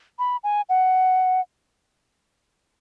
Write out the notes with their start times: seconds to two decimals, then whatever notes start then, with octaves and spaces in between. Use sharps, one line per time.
0.19 B5
0.44 G#5
0.69 F#5